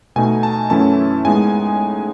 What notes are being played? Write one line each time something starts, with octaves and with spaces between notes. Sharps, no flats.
B2 A3 D#4 G#5
A5
F#2 E3 A3 C#4 E4 A5
A2 G#3 B3 D#4 G#5